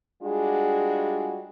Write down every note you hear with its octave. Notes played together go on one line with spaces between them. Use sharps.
G3 G#3 D4 F4 F#4 G#4